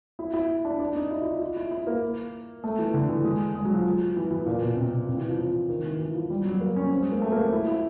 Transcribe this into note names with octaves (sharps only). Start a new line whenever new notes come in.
E4
E4
D4
D4
D#4
E4
E4
F4
F4
E4
E4
A#3
A3
E3
D3
E3
G#3
G#3
F#3
F3
E3
E3
A#2
B2
C3
C3
E3
F3
F3
D#3
E3
E3
F3
G3
F#3
A#3
C#4
C4
G#3
A#3
A3
A#3
C4
E4
E4